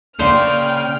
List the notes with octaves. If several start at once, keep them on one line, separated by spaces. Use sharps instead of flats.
C#3 A#3 C5 D5 F5 G5 F6